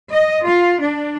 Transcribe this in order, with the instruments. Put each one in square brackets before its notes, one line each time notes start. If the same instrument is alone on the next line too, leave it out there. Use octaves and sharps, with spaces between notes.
[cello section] D#5
F4
D4